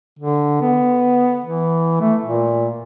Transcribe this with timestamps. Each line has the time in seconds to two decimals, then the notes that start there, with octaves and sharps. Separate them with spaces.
0.19 D3
0.62 B3
1.45 E3
2.01 A3
2.25 A#2